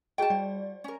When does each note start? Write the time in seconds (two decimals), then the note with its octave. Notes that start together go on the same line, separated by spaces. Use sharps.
0.18 F#4 G#4 D#5 G5 A5
0.30 G3 D5
0.84 C#4 A#4